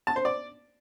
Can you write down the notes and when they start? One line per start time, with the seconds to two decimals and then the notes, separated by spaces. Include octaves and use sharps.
0.07 A5
0.16 C5
0.25 D5